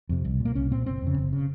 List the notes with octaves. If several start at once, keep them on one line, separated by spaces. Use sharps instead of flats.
F2 C3
C2
A#2
A#3
C2 C#4
A#2 C4
F#1 C4
F2 C#3
F#1
C#3